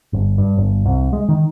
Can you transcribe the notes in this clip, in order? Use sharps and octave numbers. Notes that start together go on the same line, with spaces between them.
G1
G2
G1
C2
G#3
D#3